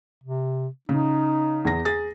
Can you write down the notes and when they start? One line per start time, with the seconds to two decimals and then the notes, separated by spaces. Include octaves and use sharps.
0.24 C3
0.89 C#3 D#4
1.65 E2 G#4 A#6
1.85 G#4 A6